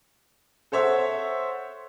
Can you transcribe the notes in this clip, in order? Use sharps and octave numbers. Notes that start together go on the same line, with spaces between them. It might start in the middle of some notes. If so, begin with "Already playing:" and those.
A4 C5 C#5 E5 F#5